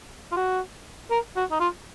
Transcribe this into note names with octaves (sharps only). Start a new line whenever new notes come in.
F4
F#4
A#4
F#4
D#4
F4